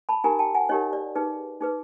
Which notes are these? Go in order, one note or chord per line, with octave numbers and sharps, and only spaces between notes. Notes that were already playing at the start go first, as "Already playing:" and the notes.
A5 B5
D#4 G4 A#4 G#5 A#5
G5 A5
F#5 G#5
D#4 G4 A#4 C#5 D#5
D5
D#4 G#4 B4
D#4 G#4 B4